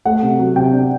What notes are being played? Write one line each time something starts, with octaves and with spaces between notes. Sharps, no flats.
A3 F#5
C3
F#3
C3 G5
D4